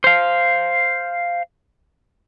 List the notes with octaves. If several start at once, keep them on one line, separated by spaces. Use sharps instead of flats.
C5 F5